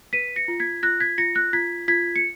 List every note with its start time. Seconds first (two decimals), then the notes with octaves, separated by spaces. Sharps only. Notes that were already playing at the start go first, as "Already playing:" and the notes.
0.13 B4 B6 D#7
0.36 A#6 C#7
0.48 F4
0.60 G#6 B6
0.83 F4 F#6 A#6
1.00 G#6 B6
1.18 F4 A#6 C#7
1.35 F#6 A#6
1.53 F4 G#6 B6
1.88 F4 G#6 B6
2.16 C#7